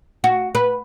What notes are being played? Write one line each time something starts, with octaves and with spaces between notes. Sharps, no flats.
F#4
B4